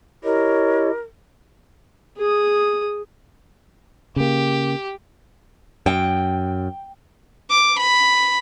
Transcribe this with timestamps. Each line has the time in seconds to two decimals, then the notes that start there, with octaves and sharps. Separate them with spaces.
0.24 E4 G4 A#4 C#5 D#5
2.17 G#4 D#6
4.16 C#3 A#3 G4
5.86 F#2 G5
7.50 D6
7.80 B5